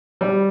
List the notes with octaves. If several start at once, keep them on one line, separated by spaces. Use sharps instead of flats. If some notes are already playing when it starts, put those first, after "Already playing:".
G3